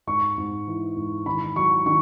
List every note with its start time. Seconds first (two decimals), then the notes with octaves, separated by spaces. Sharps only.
0.07 G#2 C#6
0.38 G#2
0.67 E3
0.96 G#2
1.26 D#3 B5
1.56 F#3 C#6
1.86 D#3 C#6